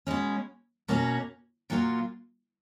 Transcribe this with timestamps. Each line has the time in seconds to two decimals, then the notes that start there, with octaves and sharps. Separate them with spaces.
0.07 B2 G#3 C#4
0.88 B2 A#3 C#4 F#4
1.70 A#2 F#3 A#3 F4